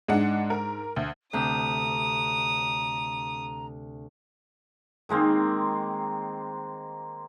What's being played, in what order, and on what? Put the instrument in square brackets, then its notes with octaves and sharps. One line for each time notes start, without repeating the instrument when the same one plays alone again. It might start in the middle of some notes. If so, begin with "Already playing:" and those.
[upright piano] G#2 [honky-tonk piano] G#3 D4 F#5
[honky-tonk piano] A#4
D2
[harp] D2 C3 E6 [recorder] A#5 [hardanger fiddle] D#6
[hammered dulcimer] D#3 G#3 A#3 C4